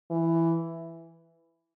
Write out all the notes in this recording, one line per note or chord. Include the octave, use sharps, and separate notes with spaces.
E3